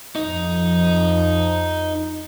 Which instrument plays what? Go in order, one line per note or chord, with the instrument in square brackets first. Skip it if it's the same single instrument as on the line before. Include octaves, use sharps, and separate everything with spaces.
[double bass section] F2 F3 [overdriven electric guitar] D#4